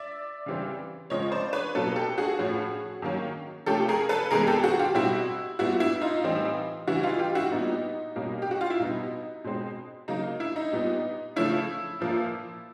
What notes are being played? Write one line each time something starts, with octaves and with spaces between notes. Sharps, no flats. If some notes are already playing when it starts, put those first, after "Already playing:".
Already playing: D5 E5
C#3 E3 G3 C4
C#3 F3 G#3 C4 C#5 D#5
C5 D5
B4 C#5
B2 F#3 A#3 C#4 A4 B4
G4 A4
F#4 G#4
A2 F3 A3 C#4
D#3 F#3 A#3 C#4
C3 F3 A3 C#4 G4 A4
G#4 A#4
A4 B4
C3 E3 G#3 B3 G#4 A#4
G4 A4
F#4 G#4
F4 G4
B2 G3 C4 E4 F#4
A#2 G3 B3 E4 F#4
E4
D#4 F4
A2 E3 G3 C4
C#3 E3 G3 E4 F#4
D#4 F4
F4 G4
E4 F#4
A#2 G3 B3 D#4
B2 G3 A#3 C#4
G4
F#4
F4
E4
B2 G3 B3 D#4
B2 G#3 C4
C#3 F#3 A#3 D#4
E4
D#4
A#2 G3 B3
C#3 F3 A3 C#4 E4
A#2 F3 A#3